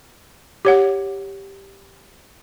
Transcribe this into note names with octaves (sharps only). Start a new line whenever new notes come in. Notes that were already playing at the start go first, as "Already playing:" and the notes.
G4 C#5 F#5